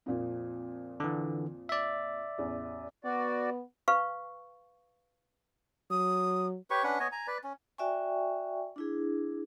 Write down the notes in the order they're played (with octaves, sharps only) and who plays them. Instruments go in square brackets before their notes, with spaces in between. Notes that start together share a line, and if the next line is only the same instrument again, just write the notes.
[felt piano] F2 A#2 F3
[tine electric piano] D3 E3
D5 E5
[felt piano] A1 E2
[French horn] B3 [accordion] F#4 D5
[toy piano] B4 F5 C#6
[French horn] F#3 [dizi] D#6
[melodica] G4 B4 C#5 C#6
C#4 D4 B4 F#5
B3 C#5 D#5 G#5
G#5 A#5
B4 D5
C#4
[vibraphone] F#4 D5 E5 G5 G#5 C#6
D4 E4 G#4